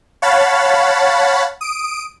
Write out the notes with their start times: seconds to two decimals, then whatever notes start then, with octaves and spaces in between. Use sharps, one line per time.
0.22 C#5 F5 F#5 A5 B5 A6
1.61 D#6 D7